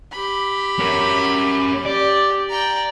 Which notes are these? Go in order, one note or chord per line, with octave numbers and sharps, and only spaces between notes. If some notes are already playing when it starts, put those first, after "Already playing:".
G4 B5
C#4 A#4
G4 D5
G5 A#5